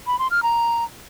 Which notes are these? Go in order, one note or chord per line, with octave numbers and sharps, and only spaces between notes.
B5
C6
F6
A#5